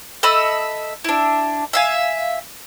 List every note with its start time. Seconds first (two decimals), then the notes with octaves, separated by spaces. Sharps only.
0.23 A4 D#5 E5 B5
1.04 D4 E4
1.73 E5 F5 G#5